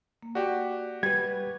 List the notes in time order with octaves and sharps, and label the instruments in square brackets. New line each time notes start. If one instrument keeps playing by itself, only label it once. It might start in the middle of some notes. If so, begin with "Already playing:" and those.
[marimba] A#3
[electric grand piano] F#4 G4 [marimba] D5
[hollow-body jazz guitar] G3 B4 [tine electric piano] G#6